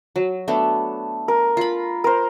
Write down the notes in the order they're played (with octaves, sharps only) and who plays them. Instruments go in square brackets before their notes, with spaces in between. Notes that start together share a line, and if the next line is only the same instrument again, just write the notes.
[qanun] F#3
A3 B3 D4
[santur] A#4
[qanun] F4 B5
[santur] A#4 C5